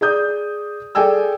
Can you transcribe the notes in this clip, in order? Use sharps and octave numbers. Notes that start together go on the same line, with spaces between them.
G#4 D5 D#6 G6
G#4 A4 D5 G5 G#5 E6